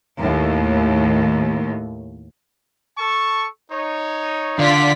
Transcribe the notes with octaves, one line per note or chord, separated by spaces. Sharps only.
D#2 A2
A4 A5 C#6
D#4 C#5
D3 F4 D5 B6